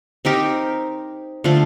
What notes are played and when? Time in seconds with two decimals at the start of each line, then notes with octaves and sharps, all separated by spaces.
0.25 C4 D#4 G4 A#4
1.44 D3 F3 A3